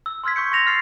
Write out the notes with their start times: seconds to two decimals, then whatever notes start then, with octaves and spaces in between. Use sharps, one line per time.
0.06 E6
0.24 C6 E6 F6 G#6 B6
0.36 C#6 G6 C#7
0.52 C6 C#6 A#6 F7
0.67 F6 A6 C7